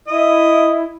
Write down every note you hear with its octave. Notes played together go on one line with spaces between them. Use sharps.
E4 D#5